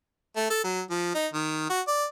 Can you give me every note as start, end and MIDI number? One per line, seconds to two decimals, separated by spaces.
0.37 0.49 57
0.50 0.64 69
0.64 0.82 54
0.91 1.14 53
1.15 1.27 63
1.34 1.69 51
1.70 1.81 66
1.88 2.05 74